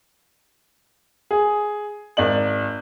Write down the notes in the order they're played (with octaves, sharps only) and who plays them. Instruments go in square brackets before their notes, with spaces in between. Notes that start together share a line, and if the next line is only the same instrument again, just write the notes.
[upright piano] G#4
G#1 D5 F#7